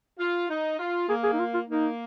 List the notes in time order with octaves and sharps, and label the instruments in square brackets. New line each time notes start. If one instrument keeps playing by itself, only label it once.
[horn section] F4
D#4
F4
[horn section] A#3 [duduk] G#4
[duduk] G#4
D#4
F4
F4
[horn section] A#3 [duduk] D#4